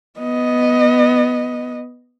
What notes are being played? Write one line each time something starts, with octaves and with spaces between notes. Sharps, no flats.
B3 D#5